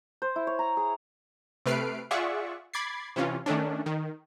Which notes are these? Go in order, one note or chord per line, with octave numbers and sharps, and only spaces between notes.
C5
E4
C#5
A#5
G#4
C3 A3 B4 F6 C7 D7
F4 G#4 D5 E5 F#5 C#6
B5 D6 G#6 A6 C7
C3 E3 C#4 F4
D#3 A3 C#4 D4
D#3